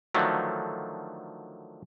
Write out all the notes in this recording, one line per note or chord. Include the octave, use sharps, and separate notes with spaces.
D3 D#3 F3 F#3 A3